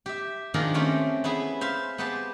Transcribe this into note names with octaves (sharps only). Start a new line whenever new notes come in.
G4 E5
D#3 F3 A#3 D4 G#4 A#4
A3 C4 C#4 G4
B3 E4 G#4 E5
C5 E5 F5
B3 G4 G#4 C5 A5